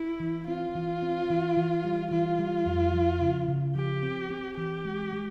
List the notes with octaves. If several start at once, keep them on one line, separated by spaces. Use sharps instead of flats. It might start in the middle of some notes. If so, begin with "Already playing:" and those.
Already playing: E4
E3
C4 F4
E3
C4
E3
E3
G3
E3 F4
G3
F2
F3
C#3
C#3
F3 G4
C4
C4
E3 G4
G#3
G#3